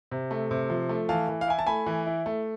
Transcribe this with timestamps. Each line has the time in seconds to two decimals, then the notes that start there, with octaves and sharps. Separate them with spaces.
0.11 C3
0.31 A3
0.51 C3
0.70 F3
0.89 A3
1.09 E3 F5 A5
1.28 E3
1.41 F5
1.48 E4 G#5
1.59 A5
1.67 A3 G#5 B5
1.86 E3
2.07 E4
2.26 A3